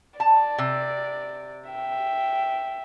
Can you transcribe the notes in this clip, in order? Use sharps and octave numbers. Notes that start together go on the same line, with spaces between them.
D5 A5
C3
E5 G5